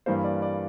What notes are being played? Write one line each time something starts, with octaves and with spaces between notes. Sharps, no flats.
G2 E3 G3 A#3 C5
D5
D5